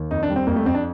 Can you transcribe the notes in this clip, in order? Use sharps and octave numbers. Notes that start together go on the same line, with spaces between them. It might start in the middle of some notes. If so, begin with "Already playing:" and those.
Already playing: D#2
F2 D#4
D4
G3
C4
F2 A#3
A3
F2 C4
D4